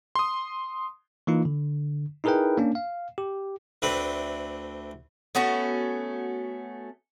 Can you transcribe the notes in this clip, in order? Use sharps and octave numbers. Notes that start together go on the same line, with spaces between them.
C6 D#6
E3 A#3 D#4 F4
D3
D#4 E4 G#4 A#4 B4 G5
A#3 C#4 D4
F5
G4
D2 A3 C4 D4 B4 B5
A3 B3 C#4 F#4